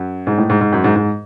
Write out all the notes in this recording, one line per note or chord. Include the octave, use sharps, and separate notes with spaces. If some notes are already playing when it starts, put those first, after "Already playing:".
Already playing: F#2
G#2
A2
G#2
G#2
F#2
G#2
G#2